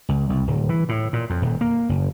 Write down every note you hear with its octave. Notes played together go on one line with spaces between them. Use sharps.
C#2
C2
D1
E3
A2
A#2
F2
D#1
A#3
F#1